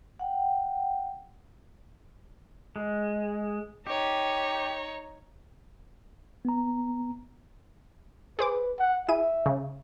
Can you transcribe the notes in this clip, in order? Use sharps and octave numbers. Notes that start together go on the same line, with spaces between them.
F#5 G5
G#3
D#4 G4 C#5
B3 A#5
G#4 B4 C5 D6
F#5
E4 G#4 E5 D#7
C#3